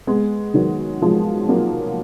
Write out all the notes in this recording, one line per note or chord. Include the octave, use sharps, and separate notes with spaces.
G#3 B3
D#3 F#3
F3 G#3
F#3 A#3